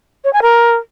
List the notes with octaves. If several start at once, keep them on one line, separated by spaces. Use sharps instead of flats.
C#5
G#5
A#4